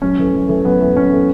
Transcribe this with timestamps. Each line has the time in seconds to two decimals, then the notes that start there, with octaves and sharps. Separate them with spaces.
0.02 F#2 C#4
0.18 E3 A3
0.34 F#2
0.48 E3 A3
0.65 F#2 B3
0.80 E3 A3
0.96 F#2 C#4
1.12 E3 A3